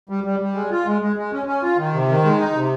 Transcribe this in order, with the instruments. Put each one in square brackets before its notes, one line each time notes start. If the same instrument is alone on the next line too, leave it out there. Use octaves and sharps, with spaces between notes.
[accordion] G3
G3
G3
G#3
F4
G#3
G#3
G#3
C#4
C#4
F4
D#3
C3
D#3
G#3
D#4
C3